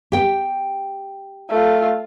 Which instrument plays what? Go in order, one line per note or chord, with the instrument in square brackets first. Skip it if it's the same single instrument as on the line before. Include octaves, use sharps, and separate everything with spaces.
[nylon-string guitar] G4 G5
[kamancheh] A3 F4